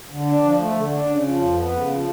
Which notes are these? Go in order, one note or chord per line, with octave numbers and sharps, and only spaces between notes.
D3
D4
F3
A3
D3
D4
C#3
F3
F2
B3
C#3
F3